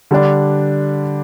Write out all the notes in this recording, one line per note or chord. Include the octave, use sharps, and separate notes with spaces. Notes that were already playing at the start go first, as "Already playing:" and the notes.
D3 G3 D4